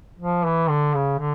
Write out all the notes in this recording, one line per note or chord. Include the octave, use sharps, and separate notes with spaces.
F3
E3
D3
C#3
D3